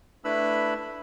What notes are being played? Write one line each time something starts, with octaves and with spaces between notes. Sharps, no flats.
A3 D4 E4 B4 B5 E6